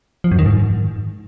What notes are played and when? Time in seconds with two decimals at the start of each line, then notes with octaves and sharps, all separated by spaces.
0.24 F3
0.31 F#2
0.39 D#3
0.46 G#2